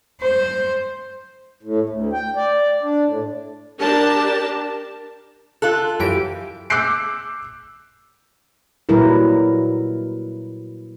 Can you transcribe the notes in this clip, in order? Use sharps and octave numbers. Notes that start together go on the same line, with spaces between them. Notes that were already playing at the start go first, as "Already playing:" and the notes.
C5
A2
D2
G5
D5
D4
A2
D4 G4 A#4 A5
F4 A4 F#6
F#2 E3 G4 D7
D6 E6 F#6 G6 C7 D7
A#2 F#3 G3 E4 A#4 B4